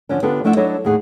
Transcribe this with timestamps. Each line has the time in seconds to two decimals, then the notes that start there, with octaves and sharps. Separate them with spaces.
0.09 D3 F3 C#4 D4
0.22 D3 B3 D4 F4 G4 A4
0.44 F3 A3 D4 E4 E5 F#5
0.56 F#3 D4 E4 A4 C#5 D#5
0.85 D#2 A2 G#4 F#5